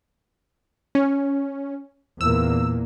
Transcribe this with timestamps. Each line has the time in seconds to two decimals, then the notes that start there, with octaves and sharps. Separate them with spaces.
0.95 C#4
2.21 E2 A#2 A#3 E6